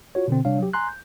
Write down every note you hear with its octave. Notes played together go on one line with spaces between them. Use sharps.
F4 F#4 C#5
B2 D3 C4
C3 G3 D4 C#5 F5
F#3 G4
G#5 A#5 C6 F#6
G6